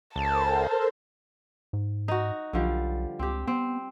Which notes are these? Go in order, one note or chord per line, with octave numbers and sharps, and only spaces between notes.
C#2 A4 A#4 C5 A5
G#2
D#4 F#4
B1 D3 F3 G3
C#2 C4 G4
B3 C4